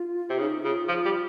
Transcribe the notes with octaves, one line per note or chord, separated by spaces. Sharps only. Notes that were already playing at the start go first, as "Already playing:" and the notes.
Already playing: F4
C3
C#3 D#4
C#3 F4
F3
G3